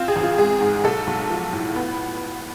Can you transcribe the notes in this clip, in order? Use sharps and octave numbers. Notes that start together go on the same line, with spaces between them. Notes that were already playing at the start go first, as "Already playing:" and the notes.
Already playing: C4 F4
G#4
A1
F4
G#3 G#4
G#2
B1 A4
B1
F3
A2
B3